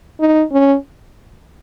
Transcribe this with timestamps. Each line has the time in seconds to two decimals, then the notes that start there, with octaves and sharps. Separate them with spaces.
0.20 D#4
0.52 C#4